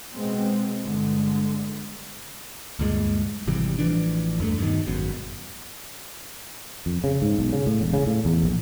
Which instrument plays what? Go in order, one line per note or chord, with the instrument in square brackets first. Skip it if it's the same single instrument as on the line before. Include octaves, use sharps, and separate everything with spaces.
[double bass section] B2 G#3 C4
G1 D3 G#3
[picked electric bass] D2 G2 A#2 G#3
G#1 C3 E3 G3
A1 E3 F3 D4
E2 G2 G#3 A3
G2 B2 D#3
G#1 F#2 B2
[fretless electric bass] F2
C#3
G#2
B1
C#3
A2
E1
C#3
A2
E2
A#1